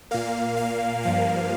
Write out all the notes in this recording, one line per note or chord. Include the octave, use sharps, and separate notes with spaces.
A#2 A#3 F5
F5
G2 F3 A#3 F5